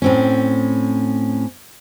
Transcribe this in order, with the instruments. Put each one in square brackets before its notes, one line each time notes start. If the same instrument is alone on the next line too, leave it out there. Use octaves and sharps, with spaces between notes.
[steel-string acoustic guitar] A2 C4 C#4